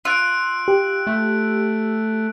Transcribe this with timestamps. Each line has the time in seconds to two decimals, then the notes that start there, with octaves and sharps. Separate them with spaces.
0.05 F4 E6 F#6 D7
0.68 G4
1.07 A3